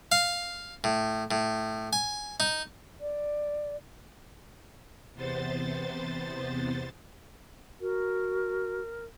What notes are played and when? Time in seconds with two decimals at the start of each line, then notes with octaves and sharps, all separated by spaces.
0.12 F5
0.84 A2
1.31 A2
1.93 G#5
2.40 D#4
3.00 D5
5.14 E2 C3 B3 C5 A6
7.81 F#4 A#4